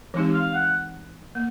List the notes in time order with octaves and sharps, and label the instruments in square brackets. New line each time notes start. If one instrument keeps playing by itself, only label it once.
[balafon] E3 G#3 C4 D#4 G4
[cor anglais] F5
F#5
[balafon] A#3